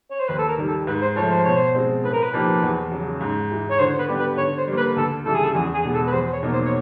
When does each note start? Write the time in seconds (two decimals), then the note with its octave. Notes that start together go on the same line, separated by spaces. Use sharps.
0.11 C#5
0.20 C5
0.28 D#2 B4
0.39 A4
0.48 A#4
0.58 D#3 G3
0.68 A4
0.87 G#2 B4
1.02 C5
1.16 F3 C#5
1.21 A3
1.31 C5
1.44 B2 C#5
1.57 C5
1.75 G#3 C4
2.04 A2 B4
2.13 A#4
2.23 B4
2.33 F3 A#3 D#4 G4
2.62 E2
2.91 C#3 F#3
3.21 G#2
3.50 E3 G#3
3.71 C#5
3.80 D3 C5
3.99 B4
4.08 G3 B3 D4 G4
4.19 B4
4.38 D3 C#5
4.58 C5
4.68 G3 A#3
4.77 B4
4.96 D2 A4
5.26 C#3 E3 G3 A4
5.35 G#4
5.44 A4
5.54 E2 G#4
5.74 G#4
5.84 B2 G#3 B3
5.94 A4
6.07 B4
6.13 E2 C5
6.33 C#5
6.43 B2 F#3 A#3 D#4
6.53 C5
6.65 C#5